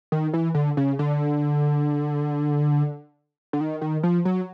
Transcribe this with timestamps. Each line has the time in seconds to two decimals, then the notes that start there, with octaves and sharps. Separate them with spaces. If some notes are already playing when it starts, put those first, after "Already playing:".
0.12 D#3
0.34 E3
0.55 D3
0.77 C#3
0.99 D3
3.53 D3
3.61 D#3
3.81 D#3
4.03 F3
4.25 F#3